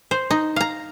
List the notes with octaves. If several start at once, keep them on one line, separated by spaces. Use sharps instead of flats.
C5
D#4
F5 A#5